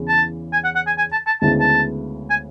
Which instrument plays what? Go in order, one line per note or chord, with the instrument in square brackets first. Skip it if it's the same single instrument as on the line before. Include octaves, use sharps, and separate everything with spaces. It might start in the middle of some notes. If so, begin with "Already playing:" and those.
Already playing: [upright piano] E2 C#3 E3
[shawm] A5
G#5
F#5
F#5
G#5
G#5
A5
A5
[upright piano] D2 C#3 G#3 B3 E4 [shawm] A5
[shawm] A5
G#5